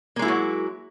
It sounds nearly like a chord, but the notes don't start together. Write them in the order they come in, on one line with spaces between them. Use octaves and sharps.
A#3 G#3 E4 F#4 F#3